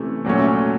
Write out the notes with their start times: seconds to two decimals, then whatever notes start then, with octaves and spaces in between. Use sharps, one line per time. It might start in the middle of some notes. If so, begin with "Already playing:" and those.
Already playing: C3 E3 A3 C#4
0.25 A#2 F#3 A3 C#4